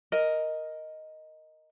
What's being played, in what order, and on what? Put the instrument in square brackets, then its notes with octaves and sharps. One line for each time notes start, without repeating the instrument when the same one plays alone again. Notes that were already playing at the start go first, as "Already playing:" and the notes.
[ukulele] A#4 D#5